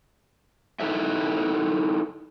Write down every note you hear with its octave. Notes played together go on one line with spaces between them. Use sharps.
D#4 E4 A4 B4 D#5 E5